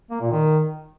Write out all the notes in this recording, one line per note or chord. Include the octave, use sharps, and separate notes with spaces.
A#3
A#2
D#3